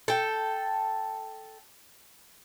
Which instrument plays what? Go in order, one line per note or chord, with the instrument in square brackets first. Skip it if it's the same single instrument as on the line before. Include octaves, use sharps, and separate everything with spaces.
[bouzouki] A4 G5